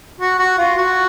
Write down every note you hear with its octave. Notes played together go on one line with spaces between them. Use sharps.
F#4
F#4
F4
F#4